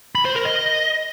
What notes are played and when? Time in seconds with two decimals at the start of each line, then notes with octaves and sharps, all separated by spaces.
0.15 B5
0.25 C5
0.35 A#4
0.45 D#5